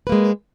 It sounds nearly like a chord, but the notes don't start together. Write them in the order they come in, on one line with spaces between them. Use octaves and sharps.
B4 A#3 G#3